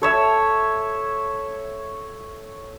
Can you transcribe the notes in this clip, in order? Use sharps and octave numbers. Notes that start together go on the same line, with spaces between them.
A4 C#5 E5